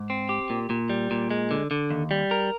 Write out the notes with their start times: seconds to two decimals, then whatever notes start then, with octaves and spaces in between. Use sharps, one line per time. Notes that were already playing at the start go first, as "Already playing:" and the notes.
Already playing: G#2
0.10 C4
0.29 G4
0.50 A#2
0.70 A#2
0.89 G3
1.11 A#2
1.31 G#3
1.51 D3
1.71 D3
1.91 D#2
2.11 G3
2.31 A#4